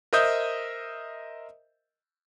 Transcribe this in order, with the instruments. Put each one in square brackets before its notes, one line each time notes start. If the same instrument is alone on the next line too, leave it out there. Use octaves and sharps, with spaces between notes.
[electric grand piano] A#4 C5 D#5 E5 D#6 G6